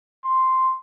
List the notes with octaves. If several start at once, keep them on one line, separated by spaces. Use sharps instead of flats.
C6